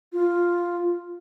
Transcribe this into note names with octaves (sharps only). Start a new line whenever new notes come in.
F4